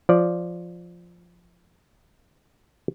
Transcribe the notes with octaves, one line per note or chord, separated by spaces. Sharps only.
F3 D5